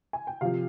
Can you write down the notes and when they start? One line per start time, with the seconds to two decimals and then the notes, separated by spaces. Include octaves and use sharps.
0.13 G#5
0.27 G5
0.41 C3 F3 F5